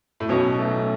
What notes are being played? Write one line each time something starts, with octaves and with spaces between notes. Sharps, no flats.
A2
B1 B2 C#4
A3